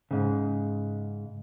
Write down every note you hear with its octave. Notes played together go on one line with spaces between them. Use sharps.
G#2 C#3